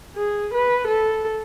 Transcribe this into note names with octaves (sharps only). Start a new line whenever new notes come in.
G#4
B4
A4